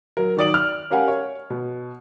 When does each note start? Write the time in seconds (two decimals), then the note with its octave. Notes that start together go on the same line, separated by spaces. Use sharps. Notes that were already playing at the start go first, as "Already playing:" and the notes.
0.17 F#3 A#4
0.37 D#3 F#3 D5 D#6 D7 F#7
0.54 F6
0.90 C#4 G4 A#4 F5 F#5 G#5
1.08 C#5
1.50 B2